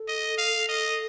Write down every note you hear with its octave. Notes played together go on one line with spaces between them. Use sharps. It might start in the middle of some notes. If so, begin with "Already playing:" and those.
Already playing: A4
D#5
F5
D#5